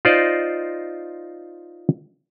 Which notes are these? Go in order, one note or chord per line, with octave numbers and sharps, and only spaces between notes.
D#4 F4 C5 D5 D#5